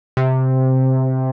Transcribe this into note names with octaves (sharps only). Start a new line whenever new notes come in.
C3